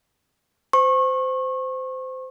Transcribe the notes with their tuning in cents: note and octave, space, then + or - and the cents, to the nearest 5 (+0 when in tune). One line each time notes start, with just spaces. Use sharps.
C5 -20 C#6 -30